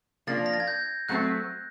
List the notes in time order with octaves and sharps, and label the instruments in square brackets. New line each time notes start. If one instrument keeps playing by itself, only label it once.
[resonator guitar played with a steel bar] F3 A#3 D4 [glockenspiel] A6
[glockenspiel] A#6
A6
G#6
G6
[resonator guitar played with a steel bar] F#3 A3 C4 [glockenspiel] F#6